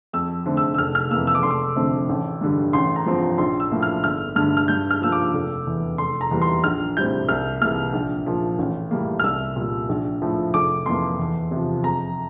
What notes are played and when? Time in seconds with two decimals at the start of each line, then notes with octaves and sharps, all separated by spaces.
0.13 F2 E6
0.46 D3 A3 C4
0.57 E6
0.74 E6
0.78 F1 F6
0.95 F6
1.11 F2 E3 A#3 E6
1.27 E6
1.35 D6
1.43 F1 C6
1.51 D6
1.76 F2 D3 A3 C4
2.09 A1
2.41 G2 D3 G3
2.73 A1 C6
2.96 A#5
3.06 G2 F3 C4
3.38 A#1 C6
3.60 E6
3.71 A2 F3 A#3
3.83 F6
4.03 G1 F6
4.36 G2 D3 A3 F6
4.57 F6
4.68 G2 G6
4.91 F6
5.01 F3 A#3 E6
5.12 D6
5.34 F1
5.67 E2 E3
5.98 F1 C6
6.21 A#5
6.31 E2 E3 G3 A#3
6.42 C6
6.64 A#1 F6
6.97 A2 G3 C4 G6
7.28 C2 F6
7.61 C3 E3 A#3 F6
7.93 A#1
8.26 A#2 F3
8.59 A1
8.91 A2 G3 A#3
9.20 F6
9.24 C2 E6
9.56 A#2 G3
9.89 A#1
10.22 A2 F3
10.54 F1 D6
10.86 F2 E3 A#3 C6
11.19 E2
11.51 C3
11.56 F3
11.84 F2 A#5